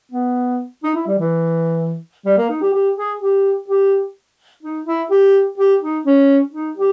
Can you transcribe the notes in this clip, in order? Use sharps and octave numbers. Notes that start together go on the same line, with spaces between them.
B3
D#4
E4
G3
E3
G3
A#3
D#4
G4
G4
G#4
G4
G4
D#4
E4
G4
G4
D#4
C#4
D#4
G4